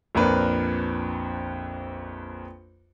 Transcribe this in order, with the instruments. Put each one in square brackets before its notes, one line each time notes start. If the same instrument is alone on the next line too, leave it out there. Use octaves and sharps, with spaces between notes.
[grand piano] A#1 F2 D4 A#4 B4